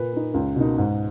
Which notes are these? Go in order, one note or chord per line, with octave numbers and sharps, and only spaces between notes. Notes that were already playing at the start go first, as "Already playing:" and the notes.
Already playing: A#2 B4
A#3 D#4
C#2
B2 A#3 D#4
G#2